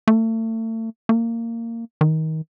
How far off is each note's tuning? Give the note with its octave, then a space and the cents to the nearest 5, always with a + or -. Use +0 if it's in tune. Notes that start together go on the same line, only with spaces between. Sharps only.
A3 +35
A#3 -20
D#3 +25